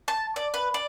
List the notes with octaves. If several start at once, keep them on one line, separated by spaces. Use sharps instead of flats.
A5
D5
B4
D5